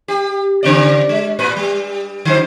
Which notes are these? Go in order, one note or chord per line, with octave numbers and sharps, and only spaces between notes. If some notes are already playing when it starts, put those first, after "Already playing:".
G4
C#3 C4 D5
G#3
A2 B4
G3
D3 F#3 C5